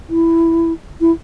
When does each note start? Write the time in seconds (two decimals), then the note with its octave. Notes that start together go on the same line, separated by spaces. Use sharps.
0.09 E4
1.01 E4